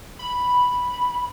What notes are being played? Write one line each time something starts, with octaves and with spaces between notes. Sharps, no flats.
B5